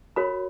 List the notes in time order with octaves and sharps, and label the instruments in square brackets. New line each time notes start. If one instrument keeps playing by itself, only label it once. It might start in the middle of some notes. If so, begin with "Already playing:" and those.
[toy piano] F#4 A#4 C#5 B5